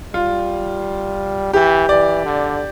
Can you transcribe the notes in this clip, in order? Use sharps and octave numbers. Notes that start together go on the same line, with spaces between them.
G3 F4
E3 G4
E3 D5
D3